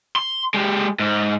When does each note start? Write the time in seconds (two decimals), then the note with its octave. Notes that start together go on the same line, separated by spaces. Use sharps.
0.16 C6
0.54 G#3 G4
1.00 G#2